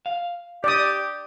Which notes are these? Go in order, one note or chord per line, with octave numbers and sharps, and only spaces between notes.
F5
G4 D5 D#6